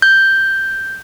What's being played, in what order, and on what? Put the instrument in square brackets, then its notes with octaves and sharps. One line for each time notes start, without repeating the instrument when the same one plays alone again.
[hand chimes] G6